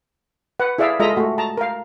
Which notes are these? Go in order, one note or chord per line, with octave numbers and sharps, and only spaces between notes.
B4 F#5
E4 G#4 D5 E5 F5
G#3 F4 A4 D#5 E5 A#5
A3 F#4
A5 A#5
A#4 F5